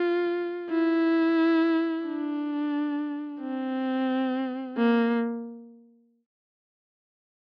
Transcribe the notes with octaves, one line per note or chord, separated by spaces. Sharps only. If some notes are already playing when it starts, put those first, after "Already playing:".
Already playing: F4
E4
D4
C4
A#3